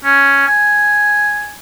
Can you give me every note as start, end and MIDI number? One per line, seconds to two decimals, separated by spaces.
0.04 0.45 61
0.47 1.55 80